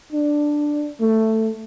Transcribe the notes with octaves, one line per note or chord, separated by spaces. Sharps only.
D4
A3